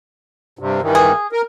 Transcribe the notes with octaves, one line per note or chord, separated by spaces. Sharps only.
G2 C3
G2 D#3 E3
G#4
A#4